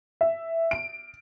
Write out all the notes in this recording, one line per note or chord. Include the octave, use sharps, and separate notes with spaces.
E5
D7